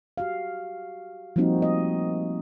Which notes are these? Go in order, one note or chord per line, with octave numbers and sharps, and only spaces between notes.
F#4 G4 F5
F3 G3 A#3 C4 D#4 F#4
A3 D#5